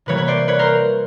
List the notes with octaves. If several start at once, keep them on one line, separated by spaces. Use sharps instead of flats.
C3 E3 G3 A#3 B4 C#5
B4 C#5
C5 D5
B4 C#5
A#4 C5